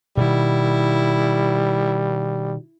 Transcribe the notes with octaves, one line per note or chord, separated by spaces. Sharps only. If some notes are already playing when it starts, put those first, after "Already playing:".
B2 D#3 G3 E4